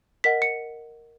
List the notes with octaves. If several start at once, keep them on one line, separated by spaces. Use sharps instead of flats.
A#4 D#5 F#5 B6
C#7